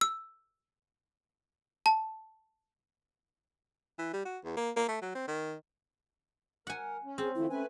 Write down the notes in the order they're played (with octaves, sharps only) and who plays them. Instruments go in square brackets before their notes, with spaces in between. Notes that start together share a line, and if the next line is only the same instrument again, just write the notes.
[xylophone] E6
A5
[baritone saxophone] E3
G3
F#4
E2
A#3
A#3
A3
F#3
C4
D#3
[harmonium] A#4 [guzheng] F#5 G#5
[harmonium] C#4
[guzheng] C4 [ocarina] G#4
[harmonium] D#3 F3 A3 [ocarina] E4
[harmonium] A3 B4 G#5 [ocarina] C#4